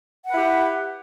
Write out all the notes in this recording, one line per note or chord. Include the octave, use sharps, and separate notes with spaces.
E4 G4 B4 F#5